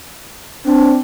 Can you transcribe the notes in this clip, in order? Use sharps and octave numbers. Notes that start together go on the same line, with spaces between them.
C4 D4